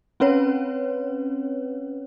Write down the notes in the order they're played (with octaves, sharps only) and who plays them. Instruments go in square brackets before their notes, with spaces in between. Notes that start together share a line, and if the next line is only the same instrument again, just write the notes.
[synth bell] C4 C#4 B4 C#5